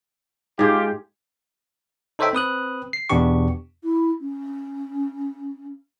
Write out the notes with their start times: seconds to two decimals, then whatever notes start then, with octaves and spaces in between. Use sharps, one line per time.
0.59 G#2 F4 G4 G#4
2.19 D#4 A4 C5 C#5 E5 G5
2.33 C4 B4 D#6 F#6
2.93 C7
3.10 E2 B2 B3 D4 G4 C#6
3.83 E4
4.21 C#4